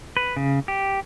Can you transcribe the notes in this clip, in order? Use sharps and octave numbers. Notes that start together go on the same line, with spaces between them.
B4
C#3
G4